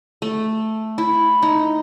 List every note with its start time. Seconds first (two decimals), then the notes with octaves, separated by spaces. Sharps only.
0.22 A3
0.98 E4
1.42 D#4